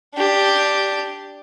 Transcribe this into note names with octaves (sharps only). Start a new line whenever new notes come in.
D4 G4